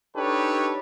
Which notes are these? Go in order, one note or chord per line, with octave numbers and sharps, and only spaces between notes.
D4 D#4 G4 A4 B4 C#5